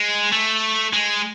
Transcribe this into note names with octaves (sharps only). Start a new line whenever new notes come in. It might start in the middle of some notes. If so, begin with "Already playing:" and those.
Already playing: G#3
A3
G#3